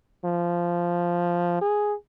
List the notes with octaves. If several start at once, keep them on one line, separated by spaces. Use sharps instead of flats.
F3
G#4